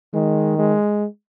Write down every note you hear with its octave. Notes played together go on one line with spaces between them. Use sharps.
D#3 G#3
G#3